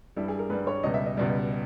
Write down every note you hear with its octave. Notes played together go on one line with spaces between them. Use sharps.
G2 G3 E4
G#4
A#4
G2 G3 B4
C#5
C#2 B2 G3 D#5
E5
D#5
C#2 B2 G3